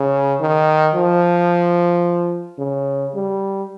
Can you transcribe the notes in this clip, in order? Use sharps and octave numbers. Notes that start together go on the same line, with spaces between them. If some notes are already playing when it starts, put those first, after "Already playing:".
Already playing: C#3
D#3
F3
C#3
G3